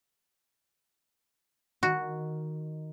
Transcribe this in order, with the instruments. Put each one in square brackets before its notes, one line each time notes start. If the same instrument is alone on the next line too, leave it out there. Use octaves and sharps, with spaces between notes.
[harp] D#3 [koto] F#4